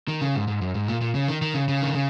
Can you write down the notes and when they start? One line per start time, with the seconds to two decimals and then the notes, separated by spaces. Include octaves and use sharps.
0.08 D#3
0.21 C#3
0.35 G#2
0.48 G#2
0.62 F#2
0.75 G#2
0.88 A#2
1.01 A#2
1.15 C#3
1.28 D#3
1.42 D#3
1.54 C#3
1.69 C#3
1.82 D#3
1.95 C#3